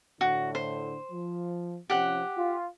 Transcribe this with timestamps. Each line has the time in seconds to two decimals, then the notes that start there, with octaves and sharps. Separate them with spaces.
0.21 A2 D3 F#4
0.55 C5
1.12 F3
1.90 C3 F3 C#4 G4 F#5
2.38 F4